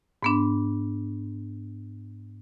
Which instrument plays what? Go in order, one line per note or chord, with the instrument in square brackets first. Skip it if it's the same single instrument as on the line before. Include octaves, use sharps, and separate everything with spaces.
[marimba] G#2 B3 D4